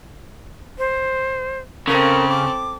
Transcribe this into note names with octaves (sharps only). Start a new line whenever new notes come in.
C5
C#3 C4 A4 A#4
D6